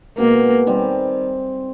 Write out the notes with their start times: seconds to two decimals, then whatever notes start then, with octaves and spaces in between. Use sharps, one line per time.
0.18 B2 G#3 A#3 B3
0.67 D#3 G3 C4